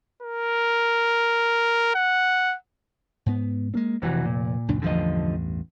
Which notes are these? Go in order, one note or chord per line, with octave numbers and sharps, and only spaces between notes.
A#4
F#5
G#2 B3
G#3 A#3 C4
F1 C3 E3 F#4
A#2
C#2 F#2 D4
A1 E2 G2 D3 F3 D#5